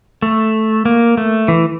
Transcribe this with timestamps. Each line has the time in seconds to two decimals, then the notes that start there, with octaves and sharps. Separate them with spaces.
0.22 A3
0.85 A#3
1.17 A3
1.48 E3